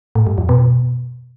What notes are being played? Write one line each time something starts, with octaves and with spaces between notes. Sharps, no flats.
A2
G2
F2
B2